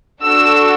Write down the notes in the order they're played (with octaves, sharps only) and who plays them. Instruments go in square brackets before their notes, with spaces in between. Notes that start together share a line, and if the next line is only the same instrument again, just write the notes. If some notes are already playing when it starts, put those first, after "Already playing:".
[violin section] D4 F#4 A4 E6